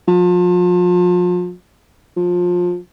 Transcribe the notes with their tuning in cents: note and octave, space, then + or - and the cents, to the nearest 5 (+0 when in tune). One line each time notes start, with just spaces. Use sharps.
F3 +35
F3 +25